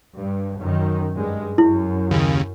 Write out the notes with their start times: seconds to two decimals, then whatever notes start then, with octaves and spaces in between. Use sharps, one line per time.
0.17 G2
0.60 F#2 D#3
1.17 G2 G#3
1.58 F#2 E4
2.11 D#2 C#3